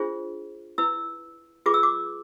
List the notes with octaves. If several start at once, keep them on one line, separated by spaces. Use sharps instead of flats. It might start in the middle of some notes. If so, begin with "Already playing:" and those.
Already playing: D4 F4 G#4 C5
E4 B4 E6
F4 G#4 B4 D6
E6
D6